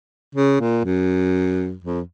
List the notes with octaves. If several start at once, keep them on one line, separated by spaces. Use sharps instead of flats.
C#3
A#2
F#2
F2